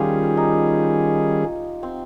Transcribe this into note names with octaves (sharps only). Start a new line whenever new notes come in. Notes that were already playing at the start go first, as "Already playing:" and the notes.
Already playing: D#3 G3 C#4 F4 G4 G#4
D#4
C4